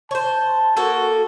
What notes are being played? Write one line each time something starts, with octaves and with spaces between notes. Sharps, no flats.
C5 C#5 A5
A#3 F#4 A4